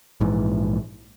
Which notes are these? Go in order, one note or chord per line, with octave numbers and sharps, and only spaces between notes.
A#1 G#2 E3